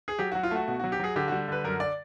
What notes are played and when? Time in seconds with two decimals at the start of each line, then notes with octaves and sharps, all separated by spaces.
0.08 G#4
0.19 F#3 G4
0.32 F#4
0.35 F#3
0.43 F4
0.51 A3 F#4
0.68 B2 F#4
0.80 F#4
0.84 F#3
0.92 G4
0.99 F#3 G#4
1.16 D3 G4
1.28 F#4
1.32 G3
1.48 D3 B4
1.64 F#2 A#4
1.80 D5